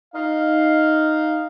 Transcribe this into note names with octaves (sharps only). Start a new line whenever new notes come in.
D#4 F5